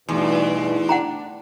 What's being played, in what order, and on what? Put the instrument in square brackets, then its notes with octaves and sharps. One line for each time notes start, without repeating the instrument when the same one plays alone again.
[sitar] E2 [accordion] G2 B2 E3 [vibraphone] A3 D#4 C6
[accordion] D4 [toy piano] F#5 G5 A#5